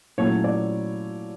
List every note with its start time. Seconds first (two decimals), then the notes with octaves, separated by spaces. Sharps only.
0.18 A#2 F#3 A3 C#4 E4 C#5
0.44 D5